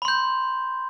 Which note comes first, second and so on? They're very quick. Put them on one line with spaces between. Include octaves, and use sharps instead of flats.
B5 C6 G6